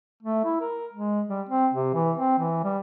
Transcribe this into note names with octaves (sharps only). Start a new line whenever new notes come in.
A3
E4
A#4
G#3
G3
C4
C3
E3
C4
E3
G3